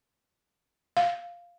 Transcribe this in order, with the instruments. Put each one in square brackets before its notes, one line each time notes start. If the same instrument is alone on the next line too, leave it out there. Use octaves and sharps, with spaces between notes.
[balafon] F5